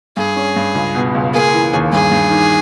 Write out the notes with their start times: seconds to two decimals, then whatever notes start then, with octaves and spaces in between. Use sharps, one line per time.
0.17 G2 G#4
0.36 C#4
0.56 G2
0.75 C#2
0.95 B2
1.15 C#2
1.33 A#3 G#4
1.53 E3
1.74 D#2
1.92 G2 G#4
2.11 G2
2.31 D#3